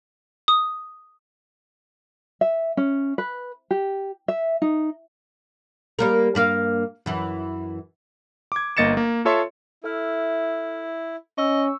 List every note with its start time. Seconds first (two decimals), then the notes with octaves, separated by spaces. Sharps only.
0.48 D#6
2.41 E5
2.77 C#4
3.18 B4
3.71 G4
4.28 E5
4.62 D#4
5.99 G3 A#3 A#4
6.35 G2 A#3 F5
7.06 F#2 E3
8.52 D6 G#6
8.77 G1 A#3 D#5 A6 C#7 E7
8.97 A#3
9.25 F4 A4 C#5 E5 C6
9.84 E4 A4 E5 F6
11.38 C#4 D#5 C#6 E6